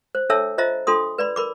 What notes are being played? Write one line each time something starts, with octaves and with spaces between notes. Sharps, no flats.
C5
D4 A4 C#5 E5 A5 E6
F4 C5 D#5 E5 A#5
D4 F4 A4 C6 D#6
B4 D5 B5
A#4 B5 D6